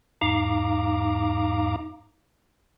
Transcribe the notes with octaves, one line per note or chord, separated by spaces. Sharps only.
E2 G#2 D#4 F5 A#5 D6